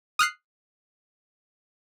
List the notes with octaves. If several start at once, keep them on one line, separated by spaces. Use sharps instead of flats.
D#6 F6 F#6 C7